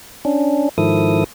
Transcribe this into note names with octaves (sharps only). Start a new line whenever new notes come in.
C#4 D4
G#2 D#3 F3 E4 A4 D#6